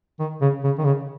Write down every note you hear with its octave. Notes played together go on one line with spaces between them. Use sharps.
D#3
C#3
C#3
D#3
C#3